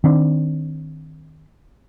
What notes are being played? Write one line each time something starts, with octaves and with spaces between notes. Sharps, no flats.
D#3 C4 D4